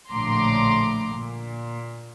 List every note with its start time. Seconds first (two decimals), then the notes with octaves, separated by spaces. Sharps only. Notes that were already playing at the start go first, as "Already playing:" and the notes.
0.11 A#1 A2 D3 A#5 C6 D6
1.16 A#2